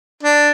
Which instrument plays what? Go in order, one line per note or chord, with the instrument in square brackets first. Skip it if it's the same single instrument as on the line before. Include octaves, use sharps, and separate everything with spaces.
[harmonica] D4